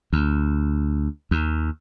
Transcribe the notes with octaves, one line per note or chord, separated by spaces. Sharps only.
D2
D#2